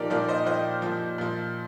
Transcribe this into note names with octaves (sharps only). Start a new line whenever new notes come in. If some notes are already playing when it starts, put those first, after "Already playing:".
Already playing: A#2 F3 D#4 G4 A#4 D5
A#2 F3 A#4 D5
C5 D#5
A#2 F3 C5 D#5
A#2 F3
A#2 F3